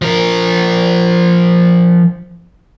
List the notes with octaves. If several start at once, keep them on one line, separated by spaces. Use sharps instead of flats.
F3 A#4